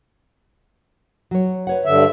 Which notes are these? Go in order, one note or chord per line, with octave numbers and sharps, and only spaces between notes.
F#3 C#5
B4 C#5 F#5
G2 D3 E5